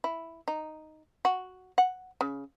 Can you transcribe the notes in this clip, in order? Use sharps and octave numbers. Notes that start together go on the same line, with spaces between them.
E4
D#4
F#4
F#5
C#3